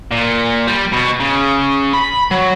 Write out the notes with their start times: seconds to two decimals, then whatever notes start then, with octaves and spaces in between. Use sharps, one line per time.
0.12 A#2
0.67 G3
0.92 B2
1.20 C#3
1.94 B5
2.31 F#3